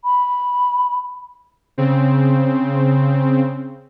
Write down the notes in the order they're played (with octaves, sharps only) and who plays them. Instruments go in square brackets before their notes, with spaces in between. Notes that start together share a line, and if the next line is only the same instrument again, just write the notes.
[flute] B5
[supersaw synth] C#3 C4